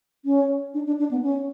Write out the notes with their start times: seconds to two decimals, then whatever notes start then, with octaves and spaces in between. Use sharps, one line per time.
0.25 C#4
0.74 D4
0.87 D4
0.99 D4
1.11 B3
1.23 C#4